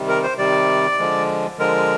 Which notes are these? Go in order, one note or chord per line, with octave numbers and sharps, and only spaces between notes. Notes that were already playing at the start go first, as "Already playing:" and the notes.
Already playing: C3 D#3 G3
A#4
C5
C3 D#3 G3 D5
D3 F3 G#3
D3 F3 G#3 A#4